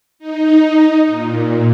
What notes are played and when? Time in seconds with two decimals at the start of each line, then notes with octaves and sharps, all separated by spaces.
0.19 D#4
1.06 A#2